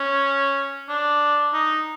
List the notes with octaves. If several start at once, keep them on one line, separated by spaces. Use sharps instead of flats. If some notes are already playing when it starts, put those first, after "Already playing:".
Already playing: C#4
D4
D#4